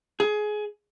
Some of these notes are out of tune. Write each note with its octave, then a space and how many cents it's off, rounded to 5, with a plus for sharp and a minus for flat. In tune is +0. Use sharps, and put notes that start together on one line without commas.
G#4 +20